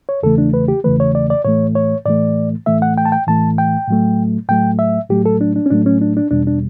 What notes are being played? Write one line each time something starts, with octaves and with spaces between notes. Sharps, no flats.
C#5
E2 C#3 E3 A3 A4
D4
B4
G4
E2 C#3 E3 A3 B4
C#5
D5
D5
A2 E3 A3 C#5
C#5
A2 E3 A3 D5
A2 E3 A3 E5
F#5
G5
A5
G5
A2 E3 A3 A5
G5
A2 F#3 A3
A2 F#3 A3 G5
E5
A2 F#3 A3 G4
A4
D4
D4
C#4
A2 F#3 A3 D4
C#4
D4
D4
E2 B2 G3 D4
D4